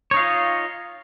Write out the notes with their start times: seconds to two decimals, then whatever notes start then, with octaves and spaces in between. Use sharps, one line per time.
0.11 C#5
0.14 D#4
0.17 F5
0.19 F4
0.22 D#5